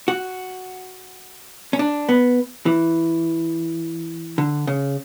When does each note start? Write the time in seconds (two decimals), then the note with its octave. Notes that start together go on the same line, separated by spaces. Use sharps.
0.08 F#4
1.73 C#4
1.79 D4
2.09 B3
2.66 E3
4.38 D3
4.67 C#3